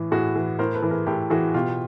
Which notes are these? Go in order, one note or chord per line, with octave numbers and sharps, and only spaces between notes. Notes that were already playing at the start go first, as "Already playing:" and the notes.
Already playing: A2 E3
A2 F#4 G#4
E3
A2 A#4 C5
A4 B4
E3
G#4 A#4
A2 G4 A4
E3 F#4 G#4
B2 F4 G4